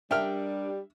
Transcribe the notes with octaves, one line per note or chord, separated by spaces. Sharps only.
G3 D4 A#4 E5 G5 F6